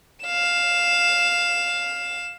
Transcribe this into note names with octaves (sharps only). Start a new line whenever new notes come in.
F5 E7